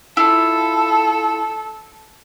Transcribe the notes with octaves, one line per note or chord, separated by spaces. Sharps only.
E4 F4 A4